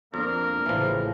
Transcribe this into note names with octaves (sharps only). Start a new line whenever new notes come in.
F2 A#3 D4 A#4
A1 C#3 E3 F3